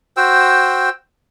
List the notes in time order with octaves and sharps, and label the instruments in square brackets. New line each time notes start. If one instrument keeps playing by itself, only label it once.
[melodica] F#4 C5 G5 E6